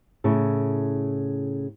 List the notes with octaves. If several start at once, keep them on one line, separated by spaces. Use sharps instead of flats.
A2 C#3